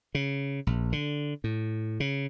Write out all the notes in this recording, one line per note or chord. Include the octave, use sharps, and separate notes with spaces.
C#3
A#1
D3
A2
C#3